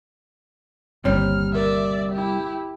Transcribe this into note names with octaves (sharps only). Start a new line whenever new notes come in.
G1 D#2 C3 G3 C#5 F6
A#4 D5 E5
E4 G4